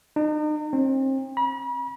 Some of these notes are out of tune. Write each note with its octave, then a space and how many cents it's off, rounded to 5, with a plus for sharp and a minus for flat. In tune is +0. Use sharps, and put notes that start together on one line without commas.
D#4 -40
C4 +35
B5 -40